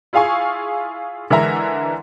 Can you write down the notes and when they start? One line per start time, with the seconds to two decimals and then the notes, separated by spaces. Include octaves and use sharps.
0.13 E4 F4 G#4 F5 G#5 C#6
1.30 D3 E3 G#3 A#4 E5 A#5